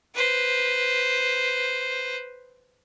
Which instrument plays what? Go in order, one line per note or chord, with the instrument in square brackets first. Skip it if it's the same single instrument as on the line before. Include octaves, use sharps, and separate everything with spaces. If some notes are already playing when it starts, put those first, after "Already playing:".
[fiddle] B4 C5